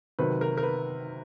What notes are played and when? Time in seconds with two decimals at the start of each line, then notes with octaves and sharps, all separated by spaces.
0.19 C3 D#3 F#3 B4
0.41 A#4
0.57 A#4
0.63 B4